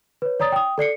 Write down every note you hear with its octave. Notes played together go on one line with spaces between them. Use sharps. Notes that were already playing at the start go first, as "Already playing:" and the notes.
B4 C#5
C#5 D5 A#5 D#6 A6
G5 D#6
A4 D5 C7 C#7